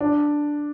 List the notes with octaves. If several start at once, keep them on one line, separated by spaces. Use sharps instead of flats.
D4